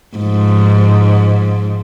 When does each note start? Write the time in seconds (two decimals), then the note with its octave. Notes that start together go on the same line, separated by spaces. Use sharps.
0.17 G#2 F3